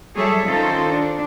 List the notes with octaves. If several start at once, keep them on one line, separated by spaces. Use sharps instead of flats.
F#3 G3 G#4 A4 C#5 E5
D#3 C#4 F4 A4 C5
D4